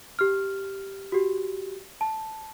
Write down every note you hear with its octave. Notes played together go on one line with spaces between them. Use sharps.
G4 F6
F#4 G4
A5